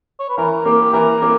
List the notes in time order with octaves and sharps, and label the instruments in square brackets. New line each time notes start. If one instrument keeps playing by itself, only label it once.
[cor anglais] C#5
B4
[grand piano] E3 [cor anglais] A#4
[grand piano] A#3 [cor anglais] G4
[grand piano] E3 [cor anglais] A#4
[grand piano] A#3 [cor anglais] G4